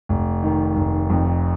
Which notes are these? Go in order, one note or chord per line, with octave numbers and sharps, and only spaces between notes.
F1
D#3
F1
F2